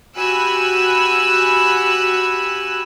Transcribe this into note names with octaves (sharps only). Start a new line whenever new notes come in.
F#4 G4 G#5 B5 E6 F#6